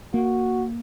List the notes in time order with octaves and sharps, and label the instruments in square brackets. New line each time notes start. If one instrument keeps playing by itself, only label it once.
[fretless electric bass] A#3 [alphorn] F#4